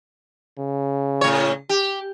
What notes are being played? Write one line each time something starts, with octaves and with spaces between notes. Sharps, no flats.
C#3
A2 C#5
G4